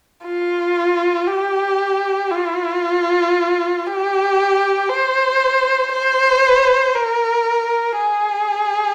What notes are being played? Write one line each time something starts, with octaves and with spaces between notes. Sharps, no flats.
F4
G4
F4
G4
C5
C5
A#4
G#4